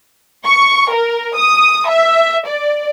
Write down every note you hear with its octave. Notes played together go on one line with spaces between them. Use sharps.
C#6
A#4
D#6
E5
D5